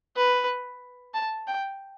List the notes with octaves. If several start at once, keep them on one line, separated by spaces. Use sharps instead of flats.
B4
A5
G5